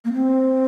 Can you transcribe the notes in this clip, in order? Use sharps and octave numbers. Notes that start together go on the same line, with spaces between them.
A#3
C4